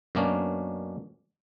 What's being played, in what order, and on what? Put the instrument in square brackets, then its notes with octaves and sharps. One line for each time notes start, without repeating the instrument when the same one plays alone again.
[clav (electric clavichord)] F#2 B2 A#3 C#4 D4